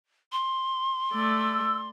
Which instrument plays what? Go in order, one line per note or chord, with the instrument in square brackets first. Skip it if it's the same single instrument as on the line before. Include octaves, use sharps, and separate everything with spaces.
[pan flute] C6
[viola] A3 D5 [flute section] E6